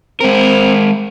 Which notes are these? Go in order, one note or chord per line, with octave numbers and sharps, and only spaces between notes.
G#3 C4 A#4